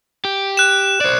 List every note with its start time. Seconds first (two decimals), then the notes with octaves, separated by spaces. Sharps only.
0.25 G4
0.57 F#6 E7
1.01 C5 D5